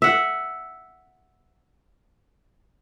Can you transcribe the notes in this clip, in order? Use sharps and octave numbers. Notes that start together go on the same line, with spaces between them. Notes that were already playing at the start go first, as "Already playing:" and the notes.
E5 F#5